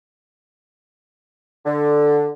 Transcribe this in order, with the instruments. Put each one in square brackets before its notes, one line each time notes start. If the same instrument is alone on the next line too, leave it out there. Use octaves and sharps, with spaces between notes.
[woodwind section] D3